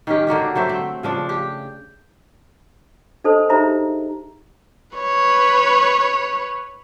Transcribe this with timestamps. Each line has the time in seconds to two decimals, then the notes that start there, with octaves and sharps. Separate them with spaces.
0.07 D#3 C#4 G4
0.27 D3 A#3 F#4 G4
0.55 F#3 A3 C5 E5
0.69 C4
1.03 C#3 F3 D4
1.29 G4
3.24 D4 A4 C5 D#5 A5
3.49 D#4 G4 G#4 C5 E5 A#5
4.97 B4 C#5